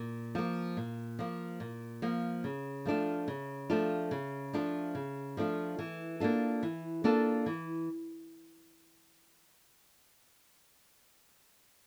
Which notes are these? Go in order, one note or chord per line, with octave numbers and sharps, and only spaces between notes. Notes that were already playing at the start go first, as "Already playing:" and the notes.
Already playing: A#2
F3 A#3
A#2
F3 A#3
A#2
F3 A#3
C#3
F3 A3 D4 F4
C#3
F3 A3 D4 F4
C#3
F3 A3 D4 F4
C#3
F3 A3 D4 F4
E3
A#3 D4 F4 A4
E3
A#3 D4 F4 A4
E3